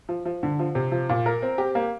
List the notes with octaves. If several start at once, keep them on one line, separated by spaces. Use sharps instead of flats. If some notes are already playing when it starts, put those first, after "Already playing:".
F3
F3
D3
F3
C3
F3
A#2
A#4
C4
G4
A#3